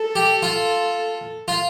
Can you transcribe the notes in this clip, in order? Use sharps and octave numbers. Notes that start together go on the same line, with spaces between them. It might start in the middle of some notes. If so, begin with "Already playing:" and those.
Already playing: A4
G4
F4
F4